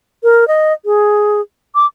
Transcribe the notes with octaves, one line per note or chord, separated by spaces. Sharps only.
A#4
D#5
G#4
D6